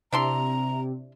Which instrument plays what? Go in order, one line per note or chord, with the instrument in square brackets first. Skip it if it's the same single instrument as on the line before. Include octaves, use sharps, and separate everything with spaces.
[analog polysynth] C3 [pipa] D4 E4 C6 [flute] A#5